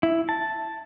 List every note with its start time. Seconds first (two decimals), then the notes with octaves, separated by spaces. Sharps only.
0.03 E4
0.29 A5